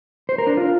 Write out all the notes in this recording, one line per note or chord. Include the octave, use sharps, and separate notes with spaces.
C5
A#4
D4
F4